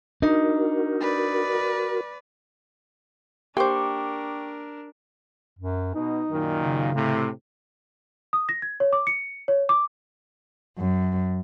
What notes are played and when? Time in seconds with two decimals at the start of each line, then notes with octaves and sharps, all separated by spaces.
0.22 D4 D#4 F#4 A#4
1.01 B4 D5
3.57 A#3 D4 G4 A#4 C5 G5 C#6 D6
5.59 F#2
5.95 B2 D#4
6.30 F#2 A#2 D#3
6.61 C#3
6.94 A2 C3
8.33 D#6
8.49 A#6
8.62 G#6
8.80 C#5
8.93 D6
9.07 C#7
9.48 C#5
9.69 D6
10.79 F#2